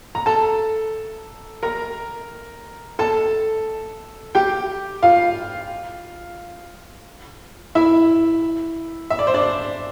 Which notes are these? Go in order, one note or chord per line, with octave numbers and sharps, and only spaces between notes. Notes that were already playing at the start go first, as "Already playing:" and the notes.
A#5
A4 A5
A#4 A#5
A4 A5
G4 G5
F4 F5
E4 E5
E5
D5
C5
D4 D5